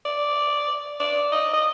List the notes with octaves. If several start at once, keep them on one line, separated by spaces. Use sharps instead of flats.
D5
D5
D#5
D#5